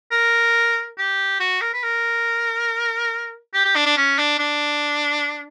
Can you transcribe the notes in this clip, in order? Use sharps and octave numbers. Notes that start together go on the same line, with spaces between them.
A#4
G4
F#4
A#4
B4
A#4
G4
G4
D4
D4
C#4
D4
D4